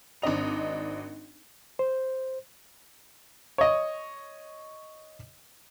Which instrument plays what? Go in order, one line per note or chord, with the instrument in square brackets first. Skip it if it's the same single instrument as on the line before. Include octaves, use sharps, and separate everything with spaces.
[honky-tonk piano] G#1 C4 D4 D#5 F7
[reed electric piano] C5
[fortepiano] C#5 D#5